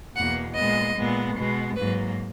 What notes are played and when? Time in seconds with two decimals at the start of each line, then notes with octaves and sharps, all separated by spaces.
0.16 E2 B2 A#3 F#5
0.55 A#2 G#3 B3 D#5
0.96 A#2 G#3 B3
1.36 B2 G#3 B3
1.77 G#2 F#3 A#3 B4